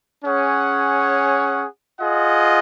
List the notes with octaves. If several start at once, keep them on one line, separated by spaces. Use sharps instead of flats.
C#4 G#4 C#5 F#5
F4 G#4 D#5 F#5